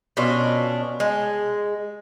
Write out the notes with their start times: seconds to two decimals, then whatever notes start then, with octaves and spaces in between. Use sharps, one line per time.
0.17 B2 C#4 D4 F4
1.00 G#3